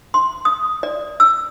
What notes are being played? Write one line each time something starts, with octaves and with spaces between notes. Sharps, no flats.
C6
D#6
D5
E6